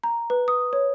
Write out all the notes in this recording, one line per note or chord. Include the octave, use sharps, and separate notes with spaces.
A#5
B4
D#6
C#5